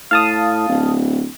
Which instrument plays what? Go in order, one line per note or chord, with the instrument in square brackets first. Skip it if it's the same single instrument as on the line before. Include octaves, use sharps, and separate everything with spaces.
[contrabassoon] A2 [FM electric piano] F5 A5 D#6
[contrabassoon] D1